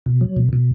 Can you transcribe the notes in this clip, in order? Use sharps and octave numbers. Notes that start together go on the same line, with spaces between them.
B2
F#3
B2
B2